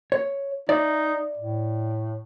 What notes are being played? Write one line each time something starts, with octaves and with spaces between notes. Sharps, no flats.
C#5
D#4 D5 E5
A2